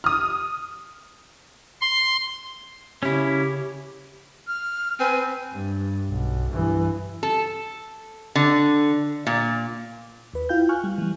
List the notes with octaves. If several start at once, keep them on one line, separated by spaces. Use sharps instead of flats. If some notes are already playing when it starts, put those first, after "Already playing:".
D#6 F6
C6
C#3 C#4 E4 G4
F6
C4 B4 G#5
G2
B1
G2 E3
A4
D3
A#2
D#2 B4
E4 F4 F5 G5 G6
G#5 C#6 F6 F#6
G3
E3 G3